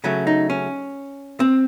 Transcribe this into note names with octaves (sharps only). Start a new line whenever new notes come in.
C#3 F#3 A3 C#4
D#4
C#4
C4